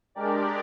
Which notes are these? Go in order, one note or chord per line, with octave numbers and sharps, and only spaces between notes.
G#3 D4 G4 A#4 D5